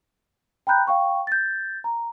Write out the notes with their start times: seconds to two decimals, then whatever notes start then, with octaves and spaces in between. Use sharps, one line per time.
0.67 G5 A#5 B5 F#6 G6
0.87 F5 G5 C#6
1.27 G6 A6
1.84 A#5